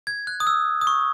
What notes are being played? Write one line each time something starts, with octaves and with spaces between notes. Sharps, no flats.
G#6
F#6
D#6
E6
D#6
C#6